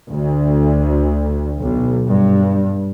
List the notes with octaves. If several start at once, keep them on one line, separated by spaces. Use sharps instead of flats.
D2
B1
G2